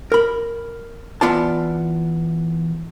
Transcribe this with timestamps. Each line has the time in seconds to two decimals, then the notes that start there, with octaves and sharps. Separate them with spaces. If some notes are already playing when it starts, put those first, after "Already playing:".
0.12 A#4 B5
1.21 E3 B3 F4 D5 A5